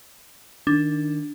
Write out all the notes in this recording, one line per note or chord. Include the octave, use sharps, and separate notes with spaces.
D#3 D4